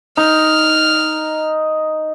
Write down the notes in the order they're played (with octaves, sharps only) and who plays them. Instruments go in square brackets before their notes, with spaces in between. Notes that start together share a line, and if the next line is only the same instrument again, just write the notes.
[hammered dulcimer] D#4 [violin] F6